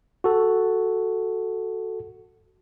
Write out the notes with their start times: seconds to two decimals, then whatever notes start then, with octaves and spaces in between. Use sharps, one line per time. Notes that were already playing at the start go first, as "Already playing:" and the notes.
0.24 F#4 A4